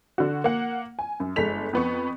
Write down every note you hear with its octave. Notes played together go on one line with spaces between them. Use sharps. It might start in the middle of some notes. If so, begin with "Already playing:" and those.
D3 F#4
A#3 F#5
G#5
F#2
G1 G#3 A4 B6 F7
F2 B3 C#6